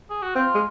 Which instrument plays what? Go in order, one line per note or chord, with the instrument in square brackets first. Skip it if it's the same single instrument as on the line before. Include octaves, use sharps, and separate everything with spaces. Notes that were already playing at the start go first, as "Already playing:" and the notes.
[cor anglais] G#4
F#4
[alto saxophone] C4 [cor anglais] F4
[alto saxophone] G#3